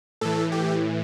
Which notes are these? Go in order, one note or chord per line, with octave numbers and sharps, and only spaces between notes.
A2 E3 A4
G4